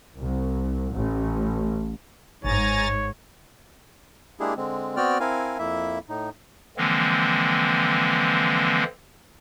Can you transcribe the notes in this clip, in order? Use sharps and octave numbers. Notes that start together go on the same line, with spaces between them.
C2
A1
G#1 G#2 C#5 G#5 A#5 A6
G#3 A#3 D4 E4 G4 G#4
D3 G#3 C4
B3 C4 F#4 D5 G5 F6
C4 E4 A#4 F5 G#5
F2 A#3 E4 E5
A2 D#4
D3 E3 F3 G#3 A#3 C4